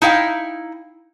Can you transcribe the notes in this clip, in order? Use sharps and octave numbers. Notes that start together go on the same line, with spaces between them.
D#4 E4 F5 G5